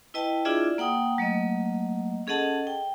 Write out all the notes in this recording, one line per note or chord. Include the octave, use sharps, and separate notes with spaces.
E4 B4 D#5 G5 A5
D4 E4 F4 G#4 D5 E5
A#3 F#5 G5 D#6
F#3 A3 A#3 D#5
C#4 G#4 A4 D#5 F#5 A5
G5